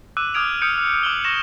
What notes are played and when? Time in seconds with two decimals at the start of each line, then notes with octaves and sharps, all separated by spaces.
0.17 D6 E6 F#6 D#7
0.34 D6 D#6 F6 G#6 D7 F7
0.62 D#6 F6 G6 C#7 D7
0.78 F6
1.03 D6 F#7 G7
1.24 C#6 A#6 E7